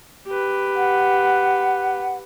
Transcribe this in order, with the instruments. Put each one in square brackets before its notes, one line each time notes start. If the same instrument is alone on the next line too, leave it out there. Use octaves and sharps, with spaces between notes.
[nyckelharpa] G4 B4
[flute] F#5